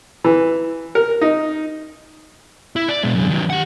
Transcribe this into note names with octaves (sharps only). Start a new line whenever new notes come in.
E3
A#4
D#4
E4
D5
B2 G#3
F#2 D3
D#3 F#3
G4 F#5